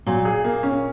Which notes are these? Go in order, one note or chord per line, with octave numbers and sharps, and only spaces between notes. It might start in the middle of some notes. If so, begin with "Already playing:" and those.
A#2 F#3
G#4
A#3
C#4